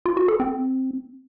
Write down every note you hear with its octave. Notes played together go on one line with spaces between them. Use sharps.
F4
F#4
A4
C4